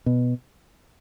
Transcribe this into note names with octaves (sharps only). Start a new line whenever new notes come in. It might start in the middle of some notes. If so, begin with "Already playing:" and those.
B2